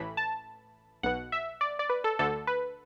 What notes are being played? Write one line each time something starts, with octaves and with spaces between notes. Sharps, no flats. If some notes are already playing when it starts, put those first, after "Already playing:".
Already playing: A1 A2 E3 B5
A5
B1 B2 F#5
E5
D5
D5
B4
A4
D2 D3 A4
B4